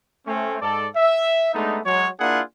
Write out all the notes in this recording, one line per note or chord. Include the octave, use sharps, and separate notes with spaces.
A3 C4 C#4
G#2 A4 D5
E5
G#3 A3 B3 D4 D#4
F#3 G#3 C#5
A#3 D4 E4 F4 G#4 F#5